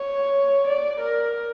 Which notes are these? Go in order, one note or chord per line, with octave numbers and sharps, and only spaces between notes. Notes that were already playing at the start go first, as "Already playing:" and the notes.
Already playing: C#5
D5
A#4